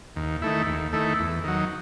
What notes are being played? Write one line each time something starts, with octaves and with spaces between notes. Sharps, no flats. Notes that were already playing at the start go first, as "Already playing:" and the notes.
D#2
D#3 A3 E4
D#2
D#3 A3 E4
E2
D#3 F#3